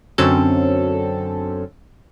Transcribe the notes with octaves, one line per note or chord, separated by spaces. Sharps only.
F#2 D3 F#3 C4 C#4 A4